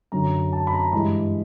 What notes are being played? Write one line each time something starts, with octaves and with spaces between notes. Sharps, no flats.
F#2 D3 F#3 A#5
A5
B5
A#5
G2 E3 G#3 B5